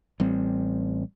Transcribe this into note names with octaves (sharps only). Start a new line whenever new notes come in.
A1 G3 C4